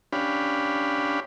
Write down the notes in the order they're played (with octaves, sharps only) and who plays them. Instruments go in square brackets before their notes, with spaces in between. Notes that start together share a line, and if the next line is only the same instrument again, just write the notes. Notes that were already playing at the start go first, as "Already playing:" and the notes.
[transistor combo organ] C#4 D4 G4 F5 B5